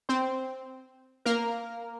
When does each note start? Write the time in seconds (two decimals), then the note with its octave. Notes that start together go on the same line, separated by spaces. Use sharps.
0.09 C4 C5
1.25 A#3 A#4